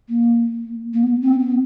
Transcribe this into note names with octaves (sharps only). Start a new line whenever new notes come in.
A#3
A#3
B3
C4
B3